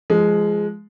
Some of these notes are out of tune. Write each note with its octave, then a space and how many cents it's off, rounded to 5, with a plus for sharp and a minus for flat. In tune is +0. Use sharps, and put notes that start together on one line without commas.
F3 -25 G#3 +0